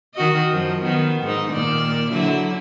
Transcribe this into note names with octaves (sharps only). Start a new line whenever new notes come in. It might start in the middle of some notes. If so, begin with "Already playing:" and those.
D#3 F#4 D#5
F#2 F3
D#3 B3
G#2 D#4
A#2 D#3 D5
D3 F#3 E4